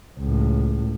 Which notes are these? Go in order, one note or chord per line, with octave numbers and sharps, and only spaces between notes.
C#2 A2